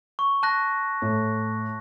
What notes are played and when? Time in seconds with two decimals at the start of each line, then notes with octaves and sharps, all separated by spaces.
0.19 C#6
0.43 A5 F#6 A#6
1.02 A2